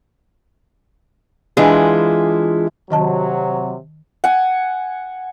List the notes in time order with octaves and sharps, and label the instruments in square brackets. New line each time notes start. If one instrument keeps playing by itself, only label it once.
[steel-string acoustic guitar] E3 G#3 D4 E4 F4 G#4
[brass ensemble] C3 F#3 [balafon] D#3 D#5 A5
[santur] F#5 G#5